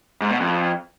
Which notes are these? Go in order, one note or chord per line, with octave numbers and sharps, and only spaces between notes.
G#2
B2
F2